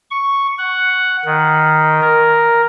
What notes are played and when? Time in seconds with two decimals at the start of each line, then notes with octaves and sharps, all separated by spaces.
0.11 C#6
0.58 F#5
1.25 D#3
2.02 A#4